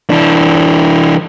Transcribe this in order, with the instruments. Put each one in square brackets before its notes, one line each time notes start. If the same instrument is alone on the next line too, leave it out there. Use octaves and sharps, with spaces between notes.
[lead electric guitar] E3 D4